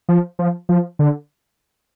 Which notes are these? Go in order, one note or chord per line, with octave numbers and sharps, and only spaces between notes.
F3
F3
F3
D3